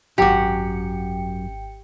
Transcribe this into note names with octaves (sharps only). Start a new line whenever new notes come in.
G#1 F#2 F#4 G4 G5 C#7